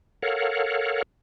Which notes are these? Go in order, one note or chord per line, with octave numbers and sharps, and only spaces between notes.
A4 A#4 C#5 F5 F#5